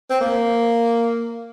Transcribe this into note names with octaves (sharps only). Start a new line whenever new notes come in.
C4
A#3